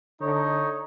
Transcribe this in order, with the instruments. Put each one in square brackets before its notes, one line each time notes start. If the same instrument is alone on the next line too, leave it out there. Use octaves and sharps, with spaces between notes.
[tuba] D3 [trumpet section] D#4 [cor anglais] C#5